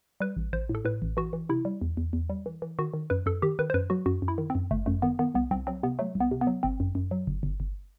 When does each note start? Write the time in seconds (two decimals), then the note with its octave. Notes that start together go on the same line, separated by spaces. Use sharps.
0.20 G3 B4
0.37 A1
0.53 A1 C5
0.69 A2
0.75 A4
0.85 A2 B4
1.02 A1
1.17 E3 F#4
1.33 E3
1.49 C3 E4
1.65 G3
1.81 E2
1.97 E2
2.13 E2
2.30 G3
2.46 E3
2.62 E3
2.79 D#3 F#4
2.94 D#3
3.10 F#2 B4
3.26 F#2 A4
3.42 D#3 G4
3.59 D#3 B4
3.70 C5
3.74 F#2 B4
3.90 F#3 F#4
4.06 F#2 F#4
4.22 F#2
4.28 E4
4.38 D#3
4.50 C4
4.55 F#2
4.71 G1 A3
4.86 F#2 A3
5.02 D#3 B3
5.19 D#3 B3
5.34 C2 B3
5.51 C2 C4
5.67 F#3 C4
5.83 C3 B3
5.99 F#3 A3
6.15 C2
6.20 B3
6.31 C3
6.41 B3
6.47 F#3
6.63 G1 C4
6.80 F#2
6.95 F#2
7.11 F#3
7.27 G1
7.43 G1
7.60 G1